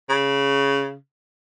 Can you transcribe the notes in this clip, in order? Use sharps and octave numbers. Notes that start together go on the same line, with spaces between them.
C#3